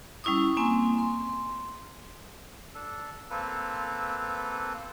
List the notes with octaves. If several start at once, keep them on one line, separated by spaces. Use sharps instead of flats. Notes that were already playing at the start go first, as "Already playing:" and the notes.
G3 C#4 E4 C#6 D#6
A#3 C4 G#5
C6
D4 A4
A#3 C4 A4 B4